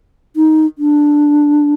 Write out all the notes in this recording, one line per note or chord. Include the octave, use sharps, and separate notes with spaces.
D#4
D4